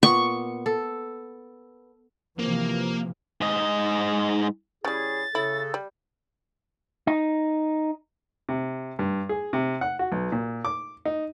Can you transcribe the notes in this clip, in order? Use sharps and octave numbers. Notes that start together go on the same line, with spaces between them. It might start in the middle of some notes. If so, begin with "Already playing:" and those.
A#2 B3 C#6
A4
C3 E3 F3 A#3
G#2 D#5
C#3 G3 C#4 E4 G#4 A6
C#3 E4 A4
G3
D#4
C3
G2
G#4
C3
F#5
F#4
B1
A#2
D6
D#4